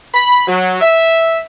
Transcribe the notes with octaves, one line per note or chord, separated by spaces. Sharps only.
B5
F#3
E5